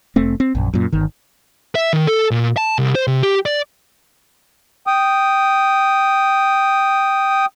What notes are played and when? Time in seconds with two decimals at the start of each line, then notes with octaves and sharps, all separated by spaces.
0.16 F1 A3 C4
0.40 C4
0.55 A#1 F#2
0.74 F#2 A#2
0.92 G1 D#3
1.75 E5
1.93 D#3
2.07 A4
2.31 A#2
2.57 A5
2.79 C2
2.95 C5
3.07 C3
3.23 G4
3.46 D5
4.87 G5 D#6